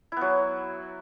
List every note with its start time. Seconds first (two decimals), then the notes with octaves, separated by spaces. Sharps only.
0.12 E4
0.17 B3
0.21 F#3